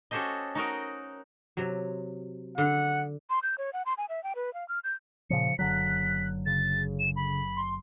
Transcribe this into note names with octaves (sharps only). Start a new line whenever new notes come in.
C#4 F#4 G4 A4 C5 D#5
D#4 F#4 A#4 D#5
C3 F#3
D3 F#5
C6
G6
C#5
F#5
C6
G#5
E5
G5
B4
F5
F6
G6
A#2 C#3 F3 C#7
F#1 D3 F#3 F#6 B6
C#3 A6
E7
B5
C6